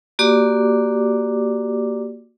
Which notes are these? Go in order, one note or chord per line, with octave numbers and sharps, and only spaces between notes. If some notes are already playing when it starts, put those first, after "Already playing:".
A#3 F#4 G4 D5 D6